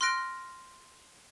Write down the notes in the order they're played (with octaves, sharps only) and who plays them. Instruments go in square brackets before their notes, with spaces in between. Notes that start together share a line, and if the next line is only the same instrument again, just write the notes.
[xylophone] C6 F6 F#6 A#6 D7